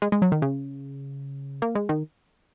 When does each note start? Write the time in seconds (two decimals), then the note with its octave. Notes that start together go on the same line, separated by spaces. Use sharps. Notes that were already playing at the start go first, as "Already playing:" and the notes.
0.02 G#3
0.12 G#3
0.22 F#3
0.32 D#3
0.42 C#3
1.62 A#3
1.75 G#3
1.89 D#3